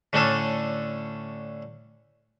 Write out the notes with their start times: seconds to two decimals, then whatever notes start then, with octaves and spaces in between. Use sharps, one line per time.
0.13 A2 D3 A3 C#4 D4 A4